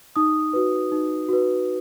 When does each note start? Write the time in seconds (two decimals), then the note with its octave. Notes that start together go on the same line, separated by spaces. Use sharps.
0.16 D#4 D#6
0.53 F#4 B4
0.92 D#4
1.29 F#4 B4